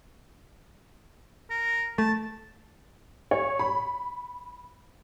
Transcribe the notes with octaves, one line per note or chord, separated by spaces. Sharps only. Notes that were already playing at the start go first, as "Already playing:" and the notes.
A#4
A3 A5
C#5
B5